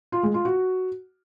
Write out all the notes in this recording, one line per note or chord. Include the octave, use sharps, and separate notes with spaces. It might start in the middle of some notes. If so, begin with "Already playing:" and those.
F4
G#3
F4
F#4